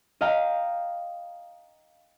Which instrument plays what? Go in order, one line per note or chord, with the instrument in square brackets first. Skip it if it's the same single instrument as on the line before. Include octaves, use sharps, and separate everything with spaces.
[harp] D#5 F5 G5 A#5